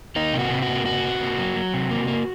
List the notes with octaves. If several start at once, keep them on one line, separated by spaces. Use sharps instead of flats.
A#3 D#4
C3
F#4
C3
F#4
A#3
C3 F#4
C3
A#3
F#3
F#3
C3
A#3
A#3